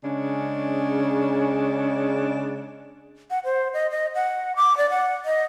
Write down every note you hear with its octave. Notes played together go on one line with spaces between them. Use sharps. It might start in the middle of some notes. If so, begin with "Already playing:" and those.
C#3 G#3 C#4 D4
F#5
C5
D#5
D#5
F#5
D6
D5
F#5
D#5